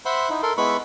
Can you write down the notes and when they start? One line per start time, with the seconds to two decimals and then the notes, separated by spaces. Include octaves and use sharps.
0.05 C5 E5 F#5 B5 C6
0.30 D#4 E4
0.43 A4 A#4 C6
0.57 G#3 B3 E4 B4 B5 C#6